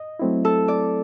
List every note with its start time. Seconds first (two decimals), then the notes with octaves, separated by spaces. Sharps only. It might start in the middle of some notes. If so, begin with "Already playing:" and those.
Already playing: D#5
0.19 F#3 A3 C4 E4
0.45 A4
0.68 D5